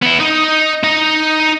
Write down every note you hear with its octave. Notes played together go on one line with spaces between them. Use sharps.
B3 E4
D#4 D#5
D#4 D#5